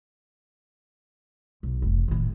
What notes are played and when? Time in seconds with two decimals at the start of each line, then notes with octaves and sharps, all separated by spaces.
1.63 B1
1.82 F1
2.08 A2 D#3